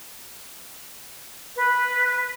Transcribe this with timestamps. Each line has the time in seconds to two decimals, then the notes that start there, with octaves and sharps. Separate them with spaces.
1.56 B4